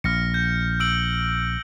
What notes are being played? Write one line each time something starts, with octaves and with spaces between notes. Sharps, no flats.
A#1 F6 A#6 C#7
G6
E6 D7 F#7